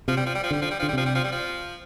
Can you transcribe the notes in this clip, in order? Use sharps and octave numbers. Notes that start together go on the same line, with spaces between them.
C3 F3
G3
F3
G3
F3
D3 G3
F3
G3
D3 F3
G3
C3 F3
G3
F3
G3
F3